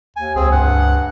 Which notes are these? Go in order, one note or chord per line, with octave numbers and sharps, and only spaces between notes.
D#2 G#5
C#2 C4 G#4
G2 F#5